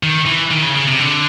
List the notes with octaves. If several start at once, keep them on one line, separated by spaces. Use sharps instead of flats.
D#3
E3
D#3
C#3
C#3
C3
D3